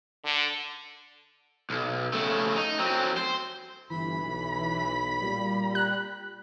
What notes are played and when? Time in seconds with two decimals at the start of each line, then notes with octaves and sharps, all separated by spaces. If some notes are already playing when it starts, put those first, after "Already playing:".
0.25 D3
1.70 B1
2.13 C#3 A3
2.56 D#4
2.79 F#3 C4
3.17 C5
3.90 G1 E3 B5
4.23 B1
5.22 A#2 G3
5.75 F#6